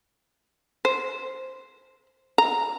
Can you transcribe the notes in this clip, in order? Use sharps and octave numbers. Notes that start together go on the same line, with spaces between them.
C5
A#5